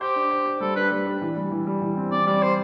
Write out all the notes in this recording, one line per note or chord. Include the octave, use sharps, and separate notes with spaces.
G4 C5
D4
C5
C5
G3 A4
D4 B4
G3
D4
E3
G3
E3
G3
E3
C4
C4 D5
G3 D5
C5